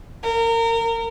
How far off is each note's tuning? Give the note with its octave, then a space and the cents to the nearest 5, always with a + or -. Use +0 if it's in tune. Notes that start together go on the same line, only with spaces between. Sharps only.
A#4 -25